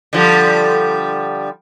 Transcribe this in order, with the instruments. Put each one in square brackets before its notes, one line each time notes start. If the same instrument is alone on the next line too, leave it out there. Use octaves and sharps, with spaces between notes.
[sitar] D3 F3 G3